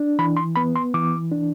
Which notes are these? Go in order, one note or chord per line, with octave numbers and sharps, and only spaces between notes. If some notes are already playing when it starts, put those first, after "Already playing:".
Already playing: D4
E3 B5
C6
B3 B5
C6
E3 D6
D4